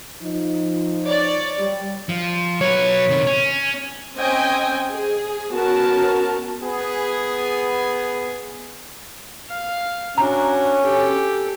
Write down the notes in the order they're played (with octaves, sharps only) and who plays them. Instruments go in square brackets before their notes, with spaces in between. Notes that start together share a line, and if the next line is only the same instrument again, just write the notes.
[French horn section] F3 D#4
[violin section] C#5 D5
[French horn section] G3
[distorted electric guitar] F3
[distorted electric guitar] F#3 B4 [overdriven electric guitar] C#5
[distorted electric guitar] C3 D#3
C#4
[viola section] C4 C#4 C5 D#5 G5 G#5
G#4
B3 C#4 F#4 A#4 A5
[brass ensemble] B3 G#4
[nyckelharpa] F5
[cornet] C#4 [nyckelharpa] D4 F#4 [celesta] A#5
[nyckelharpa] G4 A4